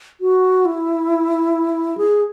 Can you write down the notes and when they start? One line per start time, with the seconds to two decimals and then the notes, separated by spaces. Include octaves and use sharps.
0.21 F#4
0.65 E4
1.97 G#4